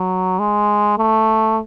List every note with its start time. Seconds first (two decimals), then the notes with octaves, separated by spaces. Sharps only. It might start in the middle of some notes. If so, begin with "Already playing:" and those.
Already playing: F#3
0.39 G#3
0.98 A3